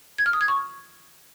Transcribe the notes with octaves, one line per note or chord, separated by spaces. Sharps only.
G#6
F6
D#6
G#6
C#6